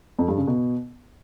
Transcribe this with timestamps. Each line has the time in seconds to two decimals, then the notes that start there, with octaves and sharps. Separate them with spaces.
0.19 F2
0.28 G2
0.38 C#3
0.47 B2